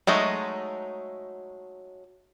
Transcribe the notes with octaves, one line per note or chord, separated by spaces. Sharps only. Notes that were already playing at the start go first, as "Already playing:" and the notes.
F#3 G#3 A3 D#4